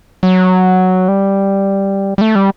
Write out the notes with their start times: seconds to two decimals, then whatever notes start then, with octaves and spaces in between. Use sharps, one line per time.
0.23 F#3
1.08 G3
2.18 G3
2.21 A3
2.35 G3